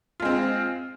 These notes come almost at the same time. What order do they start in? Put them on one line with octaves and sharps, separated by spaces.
F4 G#3 C4